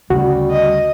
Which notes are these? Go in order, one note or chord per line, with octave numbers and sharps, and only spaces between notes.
D2 C#3 G3 F#4
D#5